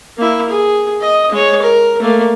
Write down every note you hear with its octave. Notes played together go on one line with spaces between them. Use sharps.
A#3 E4
G#4
D#5 D#6
G#3 C#5
A#4
A3 A#3